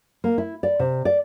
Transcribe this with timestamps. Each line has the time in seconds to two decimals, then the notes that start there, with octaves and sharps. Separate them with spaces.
0.24 A#3
0.38 E4
0.63 D5
0.79 C3
1.05 D5